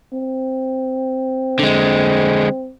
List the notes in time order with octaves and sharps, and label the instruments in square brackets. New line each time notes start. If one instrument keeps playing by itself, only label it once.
[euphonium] C4
[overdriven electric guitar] D3 G#3